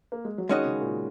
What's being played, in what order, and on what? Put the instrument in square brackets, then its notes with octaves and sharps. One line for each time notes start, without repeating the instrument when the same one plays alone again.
[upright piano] A#3
G#3
F#3
[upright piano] D#3 [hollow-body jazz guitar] G#3 C#4 F#4 D#5
[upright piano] C#3
A#2